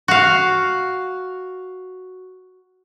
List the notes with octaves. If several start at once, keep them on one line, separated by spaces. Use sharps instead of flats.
F#4 F5